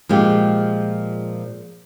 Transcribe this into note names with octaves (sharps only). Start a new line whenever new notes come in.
A#2 F3 G#3 G4